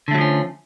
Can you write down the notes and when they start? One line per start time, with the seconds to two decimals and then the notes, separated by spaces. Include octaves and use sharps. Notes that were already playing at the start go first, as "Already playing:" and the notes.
0.08 D3
0.11 A3
0.14 F#3
0.18 F3
0.21 C#4